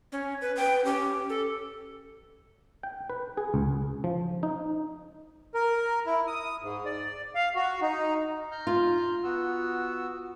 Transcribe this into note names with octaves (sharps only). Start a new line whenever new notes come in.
C#4
B4
B4 G5
C#4 G4
A4
G5
B4
G#4
C#2
F3
D#4
A#4
E4
D#6
G#2
D5
F5
F#4
D#4
A#5 F6 G6
F4
B3 F#4 E6